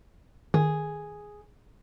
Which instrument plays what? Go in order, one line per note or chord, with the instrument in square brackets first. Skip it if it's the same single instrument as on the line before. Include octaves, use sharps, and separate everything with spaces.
[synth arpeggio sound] D#3 [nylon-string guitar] G#4